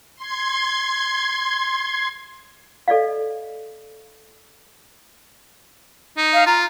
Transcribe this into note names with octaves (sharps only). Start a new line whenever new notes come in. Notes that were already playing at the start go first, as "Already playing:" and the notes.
C6 G#6
A4 D5 D#5 F5
D#4
F5
F4 A#5